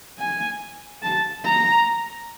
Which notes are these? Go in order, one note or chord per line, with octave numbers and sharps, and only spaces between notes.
G#5
A5
A#5